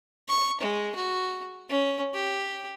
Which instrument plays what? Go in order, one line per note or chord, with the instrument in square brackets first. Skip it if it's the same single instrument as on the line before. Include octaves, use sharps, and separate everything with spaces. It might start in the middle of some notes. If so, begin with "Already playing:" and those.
[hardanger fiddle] C#6
G#3
F#4
C#4
G4